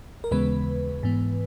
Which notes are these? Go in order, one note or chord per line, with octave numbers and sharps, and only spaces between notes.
A#4
D#2 C#3 E3 G#3 B3 B4
G#2 E3 B3